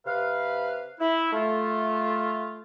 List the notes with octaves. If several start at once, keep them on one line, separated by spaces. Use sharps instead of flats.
C3 B4 F5
E4
A3 F4